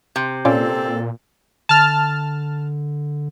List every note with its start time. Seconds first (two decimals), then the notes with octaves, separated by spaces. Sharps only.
0.16 C3
0.45 A#2 C4 C#4 F4 A4 D5
1.69 D3 A5 F6